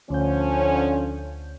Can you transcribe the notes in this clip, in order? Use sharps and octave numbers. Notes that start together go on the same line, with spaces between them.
D2 D3 F3 C#4 G6